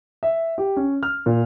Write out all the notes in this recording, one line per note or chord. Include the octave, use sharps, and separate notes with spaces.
E5
G4
C#4
F6
A#2